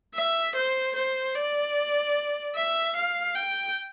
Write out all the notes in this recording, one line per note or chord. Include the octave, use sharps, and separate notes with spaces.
E5
C5
C5
D5
E5
F5
G5